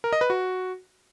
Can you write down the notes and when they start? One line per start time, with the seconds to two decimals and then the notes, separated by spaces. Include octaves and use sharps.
0.04 A#4
0.13 D#5
0.21 B4
0.30 F#4